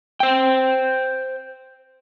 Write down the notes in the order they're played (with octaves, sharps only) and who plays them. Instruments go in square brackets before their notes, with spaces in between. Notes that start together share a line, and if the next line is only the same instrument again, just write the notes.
[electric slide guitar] C5 G5